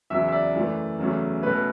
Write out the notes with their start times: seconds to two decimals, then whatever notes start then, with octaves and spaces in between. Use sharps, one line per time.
0.10 E2 C#3 F#3 E5
0.28 E5
0.32 D5
0.54 F#2 E3 A3
0.99 E2 C#3 F#3 A3 C#4
1.42 B2 A3 C#4 B4